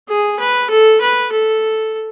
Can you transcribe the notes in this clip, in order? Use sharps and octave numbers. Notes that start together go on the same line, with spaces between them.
G#4
B4
A4
B4
A4